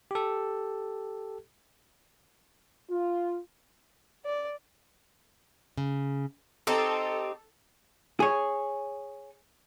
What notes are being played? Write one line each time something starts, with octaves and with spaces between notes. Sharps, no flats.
G4 A4
F4
D5
C#3
C4 D#4 G4 A4
G#4 C#5